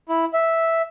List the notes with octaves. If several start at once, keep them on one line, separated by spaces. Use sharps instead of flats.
E4
E5